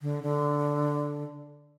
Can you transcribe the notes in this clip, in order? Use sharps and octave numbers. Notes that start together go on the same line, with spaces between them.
D3
D3